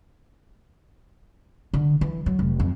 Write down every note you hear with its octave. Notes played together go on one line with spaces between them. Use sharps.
D3
E3
F#3
F1
F2